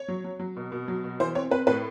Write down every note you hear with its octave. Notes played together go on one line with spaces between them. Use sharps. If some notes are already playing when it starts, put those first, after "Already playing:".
Already playing: C#5
F#3
F#3
F#3
B2
B2
F#3
B2
E3 C5
C4 C#5
C4 B4
A2 B4